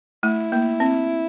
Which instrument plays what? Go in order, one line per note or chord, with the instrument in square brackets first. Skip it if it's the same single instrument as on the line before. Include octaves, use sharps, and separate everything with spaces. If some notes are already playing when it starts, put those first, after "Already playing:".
[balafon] A3 [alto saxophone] E4
[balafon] A#3
C4